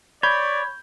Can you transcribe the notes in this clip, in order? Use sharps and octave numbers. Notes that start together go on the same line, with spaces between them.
C#5 D5 B5 G6